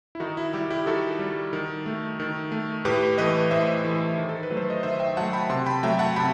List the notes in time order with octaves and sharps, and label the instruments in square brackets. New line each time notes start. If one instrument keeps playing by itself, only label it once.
[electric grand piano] E4
D#3 D#4 F#4
E4
G3 E4 G4
E4 G4
D#3 F#4 A4
G3
D#3
A3
D#3
A3
A2 G4 B4
E3 A3 B4 D#5
A2 C5 E5
E3 A3
D#3
A4
B4
F#3 A3
C5
D#5
D#3 C5 E5
E5 G5
F#3 A3 F#5 A5
G5 B5
C3 A5 C6
G5 B5
F#3 A3 E5 G5
F#5 A5
C3 G5 B5